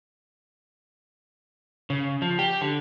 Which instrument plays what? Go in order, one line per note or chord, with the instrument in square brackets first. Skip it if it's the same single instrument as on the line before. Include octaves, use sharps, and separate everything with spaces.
[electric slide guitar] C#3
F3
G4
D3